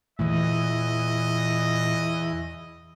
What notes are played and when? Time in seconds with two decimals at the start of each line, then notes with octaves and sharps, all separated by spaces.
0.19 E2 A#2 E3 A3 D#5